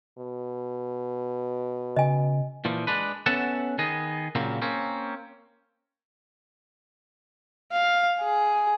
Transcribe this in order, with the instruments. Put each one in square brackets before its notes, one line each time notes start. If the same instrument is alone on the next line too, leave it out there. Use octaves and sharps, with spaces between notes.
[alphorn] B2
[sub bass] C#3 [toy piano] D#5 G#5
[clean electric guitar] A#2 E3 F3
G#3 D4 B4
B3 C#4 A4 E5 F#5 A5
D#3 B3 G#4 D#5
A#2 C#3 F#3 A#3 C4
A#3 C4 C#4
[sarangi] F5
G#4